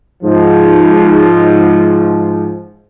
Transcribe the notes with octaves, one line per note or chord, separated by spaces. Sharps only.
G#2 F3